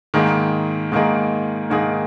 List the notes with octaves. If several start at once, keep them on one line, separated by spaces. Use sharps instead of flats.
G#2 D#3 A#3 D#4 G#4
G#2 D#3 A#3 D#4 G#4
G#2 D#3 A#3 D#4 G#4